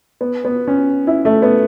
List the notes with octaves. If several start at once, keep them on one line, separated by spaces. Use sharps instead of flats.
B3
B3
C#4
E4
A3
B3